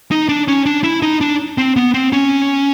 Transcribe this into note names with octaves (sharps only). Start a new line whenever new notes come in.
D#4
D4
C#4
D4
E4
D#4
D4
C4
B3
C4
C#4